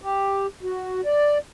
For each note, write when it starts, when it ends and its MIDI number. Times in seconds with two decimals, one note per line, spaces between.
0.02 0.47 67
0.63 1.01 66
1.05 1.38 74